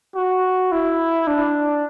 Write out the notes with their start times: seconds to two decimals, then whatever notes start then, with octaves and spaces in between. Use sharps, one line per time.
0.16 F#4
0.72 E4
1.27 D4